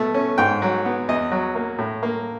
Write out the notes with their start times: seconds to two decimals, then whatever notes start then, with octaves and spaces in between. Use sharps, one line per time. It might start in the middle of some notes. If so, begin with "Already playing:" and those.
Already playing: B2 A3
0.14 C#4
0.38 G#2 G5
0.62 F#3
0.85 B3
1.08 E2 D#5
1.32 F#3
1.55 A#3
1.79 A2
2.03 A#3